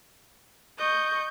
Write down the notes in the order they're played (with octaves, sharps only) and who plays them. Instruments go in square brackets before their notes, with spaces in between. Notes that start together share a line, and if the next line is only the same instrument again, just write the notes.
[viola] D#5 C#6 [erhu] G6